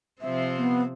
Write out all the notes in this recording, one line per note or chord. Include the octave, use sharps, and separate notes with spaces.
C3 F3 C4 E5
B3